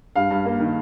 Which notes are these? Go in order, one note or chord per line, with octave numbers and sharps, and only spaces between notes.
G2 F5
G2
A#3
D#3